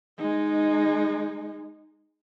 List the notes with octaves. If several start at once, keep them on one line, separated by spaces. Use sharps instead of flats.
G#3 D#4